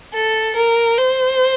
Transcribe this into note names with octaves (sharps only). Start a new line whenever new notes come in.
A4
A#4
C5